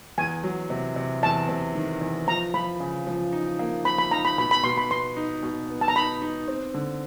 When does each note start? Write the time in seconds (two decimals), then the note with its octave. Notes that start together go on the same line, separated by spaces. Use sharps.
0.18 E2 G#5
0.43 F#3
0.70 C3
0.96 C3
1.23 E2 A5
1.49 C3
1.75 D#3
2.01 E2
2.28 F3 A#5
2.54 F3 B5
2.80 C#3
3.07 F3
3.33 D#4
3.59 A#3
3.85 F3 B5
3.98 B5
4.11 D#4 A#5
4.25 B5
4.38 B2 B5
4.51 B5
4.64 B2 C6
4.78 B5
4.90 B3 C6
5.17 D#4
5.43 B2
5.69 B3
5.81 A5
5.88 A#5
5.95 D#4 B5
6.22 D#4
6.48 C4
6.74 D3